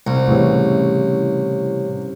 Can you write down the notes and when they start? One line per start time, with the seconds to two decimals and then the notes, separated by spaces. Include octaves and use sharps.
0.07 C2
0.28 A2 C#3 E3 C#4 G4 C#5